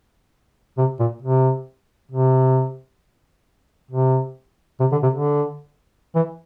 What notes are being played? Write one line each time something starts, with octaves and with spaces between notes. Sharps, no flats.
C3
A#2
C3
C3
C3
C3
D3
C3
D3
E3